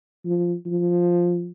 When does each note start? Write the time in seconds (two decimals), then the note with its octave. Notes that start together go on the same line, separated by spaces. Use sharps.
0.25 F3
0.66 F3